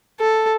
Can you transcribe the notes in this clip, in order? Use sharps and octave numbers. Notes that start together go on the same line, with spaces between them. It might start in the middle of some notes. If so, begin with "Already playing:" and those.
A4